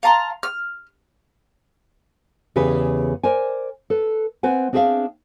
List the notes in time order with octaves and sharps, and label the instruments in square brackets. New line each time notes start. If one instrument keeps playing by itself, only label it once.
[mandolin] F5 A5 A#5 C6
F6
[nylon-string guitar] E2 C#3 G4 G#4 B4
A#4 C5 D5 G#5
A4 B4
C4 B4 F#5 G#5
C4 D4 G#4 C5 E5 F5